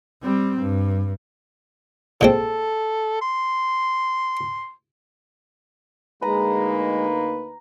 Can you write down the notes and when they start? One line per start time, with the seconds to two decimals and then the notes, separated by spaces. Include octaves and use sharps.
0.22 G3 C4
0.60 G2
2.21 A#2 G#3 C4 A4
3.21 C6
6.22 D2 G#3 A#3 D#4 B4 A#5